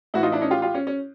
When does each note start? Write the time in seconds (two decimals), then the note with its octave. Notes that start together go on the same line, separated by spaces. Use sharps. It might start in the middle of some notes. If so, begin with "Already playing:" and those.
0.14 A2 E3 E4 F#4
0.23 D#4 F4
0.32 D4 E4
0.41 C#4 D#4
0.50 F4 G4
0.62 F4 G4
0.74 C#4
0.87 C#4